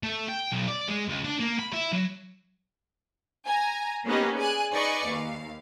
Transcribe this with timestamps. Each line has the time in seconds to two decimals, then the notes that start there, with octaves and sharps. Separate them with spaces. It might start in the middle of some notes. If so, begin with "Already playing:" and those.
0.03 A3
0.28 G5
0.52 B1
0.68 D5
0.88 G#3
1.08 C#2
1.24 D4
1.40 A#3
1.60 B5
1.73 E4
1.93 F#3
3.45 G#5 A#5
4.05 A#3 B3 C#4 D#4 G4 B4
4.36 G#4 D5 G#5 F#6
4.73 D#4 G#4 B4 D5 D#5 C#6
5.07 D#2 F5